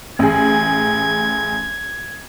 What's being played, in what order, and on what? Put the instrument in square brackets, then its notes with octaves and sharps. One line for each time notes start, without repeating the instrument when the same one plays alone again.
[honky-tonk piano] A1 G#4 [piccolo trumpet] G#6